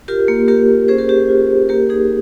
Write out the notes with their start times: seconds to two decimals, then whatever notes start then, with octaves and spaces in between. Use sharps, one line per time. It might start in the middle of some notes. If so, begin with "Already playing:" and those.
0.08 F4 G4 A#4
0.28 A#3
0.48 A#3 G4 A#4
0.68 A#3
0.88 C#4 G#4 C5
0.98 G4 A#4
1.09 C#4 G4
1.29 F4
1.49 A#3
1.69 A#3 G4 A#4
1.89 D#4 G#4